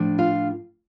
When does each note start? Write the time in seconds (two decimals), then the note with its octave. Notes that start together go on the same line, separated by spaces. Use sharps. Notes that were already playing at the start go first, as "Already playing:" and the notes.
Already playing: A2 F3 D4
0.18 F4 F5